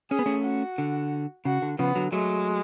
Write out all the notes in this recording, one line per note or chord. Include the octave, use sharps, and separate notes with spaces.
C#4 G#4
B3
A3 C#4
F#4
D3
C#3 F#4
D3
C#3 F3 B3
D3 F#3
F#3 G#3 A3